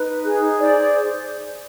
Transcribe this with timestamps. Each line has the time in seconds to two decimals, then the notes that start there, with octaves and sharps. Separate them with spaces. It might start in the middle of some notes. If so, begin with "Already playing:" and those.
Already playing: D#4 B4
0.24 G#4
0.58 C5 D5
0.92 C5